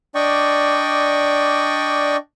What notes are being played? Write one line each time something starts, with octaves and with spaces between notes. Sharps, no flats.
D4 D5 D#5 G5 C#6